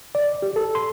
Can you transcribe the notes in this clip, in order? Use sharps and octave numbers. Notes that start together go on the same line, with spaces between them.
D5
G4
A4
C6